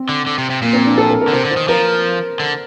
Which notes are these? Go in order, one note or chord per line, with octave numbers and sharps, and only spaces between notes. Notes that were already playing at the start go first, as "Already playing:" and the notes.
Already playing: C4
D3
D3
C3
C3
A#2 A#3
C4
D4
A4
A#4
A#4
D3
C3 C5
D3
C5
D#3
F3 A#4
D3